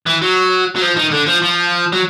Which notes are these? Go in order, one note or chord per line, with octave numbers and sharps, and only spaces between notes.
E3
F#3
F#3
F3
D#3
D3
F3
F3
F#3